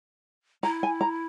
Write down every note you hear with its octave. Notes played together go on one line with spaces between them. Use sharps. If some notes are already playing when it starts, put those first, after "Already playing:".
E4 A#5
G#5
A#5